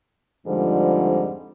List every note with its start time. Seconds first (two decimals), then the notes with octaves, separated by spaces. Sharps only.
0.47 F2 G#2 D3 F3 G3